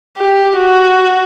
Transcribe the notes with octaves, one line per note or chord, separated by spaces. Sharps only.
G4
F#4